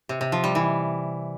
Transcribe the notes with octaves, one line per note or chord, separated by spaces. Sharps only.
C3
C3
F3
G3
E3